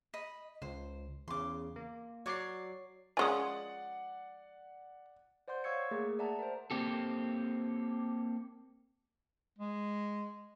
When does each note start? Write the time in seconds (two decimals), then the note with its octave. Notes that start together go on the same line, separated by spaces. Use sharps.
0.14 D#5 B5
0.62 C#2 C5
1.28 E2 C#3 C6 D6
1.76 A#3
2.26 F#3 C#5 D5 D6 C7
3.17 F3 G#3 C#4 D5 F#5 G#5 C6 D#6
5.48 C5 D5 F#5 C6 G6
5.64 C#5 F5 C#6 E6 G#6 C#7
5.91 A3 A#3 G#4 A#4
6.19 D5 E5 F#5 A5 A#5
6.39 A#4 C5
6.71 A#3 C4 G4 A4
9.59 G#3